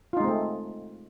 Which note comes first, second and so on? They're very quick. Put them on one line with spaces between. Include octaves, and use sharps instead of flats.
F4 D#4 G#3 C4 A3